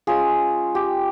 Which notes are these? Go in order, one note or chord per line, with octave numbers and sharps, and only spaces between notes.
G#3 C#4 F4 G#4
G4